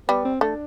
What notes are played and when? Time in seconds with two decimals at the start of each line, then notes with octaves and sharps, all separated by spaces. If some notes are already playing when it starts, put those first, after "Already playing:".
0.09 G3 B3
0.25 C4
0.41 A3 D4